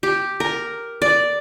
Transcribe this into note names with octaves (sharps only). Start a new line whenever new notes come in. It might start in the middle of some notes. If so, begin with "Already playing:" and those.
G4
A#4
D5